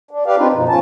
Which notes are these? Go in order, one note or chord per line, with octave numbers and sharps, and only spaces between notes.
D4
G4 B4 D5 F5
C4 D4 D#4 F4 G4 B4
F#2 B2 F3 D#4
G#2 B2 F3 C#4 F4 A5